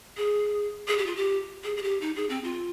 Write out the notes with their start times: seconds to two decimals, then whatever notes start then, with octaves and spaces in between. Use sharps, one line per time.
0.17 G#4
0.88 G#4
0.98 G4
1.06 F4
1.16 G4
1.64 G#4
1.77 G#4
1.83 G4
2.01 D#4
2.16 G#4
2.29 C4
2.44 F4